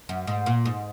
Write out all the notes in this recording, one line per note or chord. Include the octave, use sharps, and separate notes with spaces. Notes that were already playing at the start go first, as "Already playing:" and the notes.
F#2
G#2
A#2
G#2